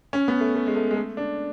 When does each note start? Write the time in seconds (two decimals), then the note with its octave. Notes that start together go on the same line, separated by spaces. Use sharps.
0.13 C#4
0.28 B3
0.41 A3
0.56 A3
0.67 G#3
0.76 A3
0.91 G#3
0.96 A3
1.17 D4